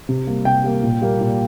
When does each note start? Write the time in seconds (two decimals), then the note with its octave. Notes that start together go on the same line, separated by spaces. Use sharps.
0.09 C3
0.27 G3 A#3
0.45 C3 G5
0.64 G3 A#3
0.82 A#2
1.01 G3 A#3
1.21 A#2